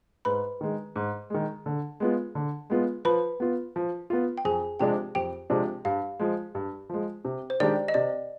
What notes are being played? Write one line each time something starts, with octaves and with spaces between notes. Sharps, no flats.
G#2 B4 B5
D#3 G#3
G#2
D#3 G#3
D3
G#3 B3 F4
D3
G#3 B3 F4
F3 B4 B5
B3 F4
F3
B3 F4
G5
F2 G#4 G#5
C3 F3 G#3 D4 G4 G5
F2 G4 G5
C3 F3 G#3 D4
G2 F5
F3 G#3
G2
F3 G#3
C3
C5
D#3 G#3 D4 G4 D5
D#5
C3 D5